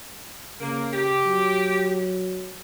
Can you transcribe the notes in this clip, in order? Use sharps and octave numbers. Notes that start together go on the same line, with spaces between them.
C#3 A#3
G4
F#3